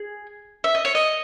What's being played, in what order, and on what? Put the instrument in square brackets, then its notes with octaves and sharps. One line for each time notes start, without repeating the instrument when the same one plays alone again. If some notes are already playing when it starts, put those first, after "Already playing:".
Already playing: [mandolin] G#4
E5
D#5
C#5
D#5